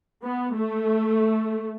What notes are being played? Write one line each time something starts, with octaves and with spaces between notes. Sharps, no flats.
B3
A3